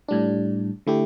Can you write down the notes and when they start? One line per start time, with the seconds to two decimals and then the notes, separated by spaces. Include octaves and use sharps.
0.08 A2 G3 D4
0.87 D3 A3 E4 G4